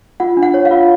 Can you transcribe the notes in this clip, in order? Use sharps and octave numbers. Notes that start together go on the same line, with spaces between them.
F4 F#5
D4
F#5
C#5
F5
F4